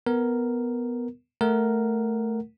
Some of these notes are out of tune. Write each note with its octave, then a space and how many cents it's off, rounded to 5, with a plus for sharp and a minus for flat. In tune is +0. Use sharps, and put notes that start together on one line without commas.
B3 +0 A#4 +0
A3 +0 A#4 +0 F#5 +0